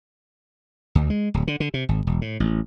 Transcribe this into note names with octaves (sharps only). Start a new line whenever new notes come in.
D2
G#3
D1
D3
D3
C3
G#1
E1
A2
A1